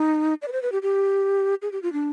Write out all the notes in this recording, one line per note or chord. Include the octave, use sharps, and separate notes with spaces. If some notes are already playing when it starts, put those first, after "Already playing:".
Already playing: D#4
D5
B4
C5
B4
G4
G4
G#4
G4
F4
D4